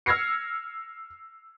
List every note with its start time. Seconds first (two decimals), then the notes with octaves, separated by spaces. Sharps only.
0.06 E6 F6 G#6 A#6 C7 C#7